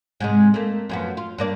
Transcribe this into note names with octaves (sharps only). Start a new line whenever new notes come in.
G#2 C3 G#3
A3 A#3
F#2 F3 B3
F4
G2 A#3 D5